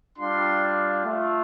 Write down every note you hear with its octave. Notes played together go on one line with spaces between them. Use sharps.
G3 D4 F4 C6
A3 F4